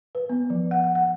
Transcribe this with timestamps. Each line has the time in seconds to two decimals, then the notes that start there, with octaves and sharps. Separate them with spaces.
0.15 B4
0.30 B3
0.50 F3
0.71 F#5
0.84 F#5
0.95 F#5